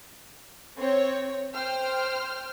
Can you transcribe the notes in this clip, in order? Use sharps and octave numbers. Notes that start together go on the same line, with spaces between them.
C4 C#5
C5 G5 F6